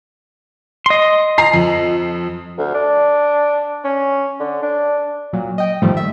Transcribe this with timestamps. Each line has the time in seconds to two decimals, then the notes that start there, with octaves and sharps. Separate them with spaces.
0.86 D#5 C6
1.38 A#5 C7
1.54 F2
2.58 D2
2.74 D4
3.84 C#4
4.39 D3
4.62 D4
5.33 A#2 F#3
5.58 D#5 G5
5.82 G#2 D#3 F3 G3 A3
5.97 E5